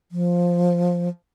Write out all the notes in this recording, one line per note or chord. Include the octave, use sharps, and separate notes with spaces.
F3